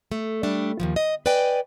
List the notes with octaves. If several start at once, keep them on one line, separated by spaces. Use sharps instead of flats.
A3
G3 A3 D4
D#2 G#2 F3
D#5
B4 D5 D#5 G5 G#5